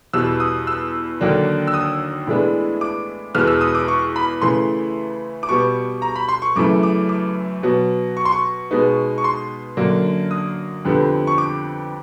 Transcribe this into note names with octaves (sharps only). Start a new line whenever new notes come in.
E2 B2 G3 E6
D#6
E6
D#2 D3 F#3 A#3 D4
E6
D#6
A2 E3 G#3 B3 D4
D6
E2 B2 G#3 B3 F6
E6
D#6
D6
C#6
B5
C#3 E3 A3 C6
D6
B2 G3 B3 C#6
A#5
B5
C6
C#6
F#2 C#3 E3 A3 D6
D6
D6
B2 F#3 B3
C#6
C6
C#6
B2 G#3 B3 D#4
C#6
C6
F#2 D3 F#3 A#3 D4
D#6
F2 D3 G3 B3
C#6
D6